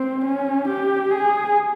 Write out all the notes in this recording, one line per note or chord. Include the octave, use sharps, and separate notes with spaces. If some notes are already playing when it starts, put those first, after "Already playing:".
Already playing: C4
C#4
G4
G#4